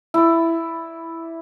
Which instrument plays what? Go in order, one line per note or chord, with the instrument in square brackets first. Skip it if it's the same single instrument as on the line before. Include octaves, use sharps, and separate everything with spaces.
[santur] E4 D5